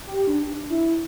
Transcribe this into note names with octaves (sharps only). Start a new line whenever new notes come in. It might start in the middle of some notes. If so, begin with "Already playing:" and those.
G4
D4
D4
E4